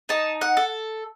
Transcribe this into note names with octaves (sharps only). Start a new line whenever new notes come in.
D#4 A5
F#5
A4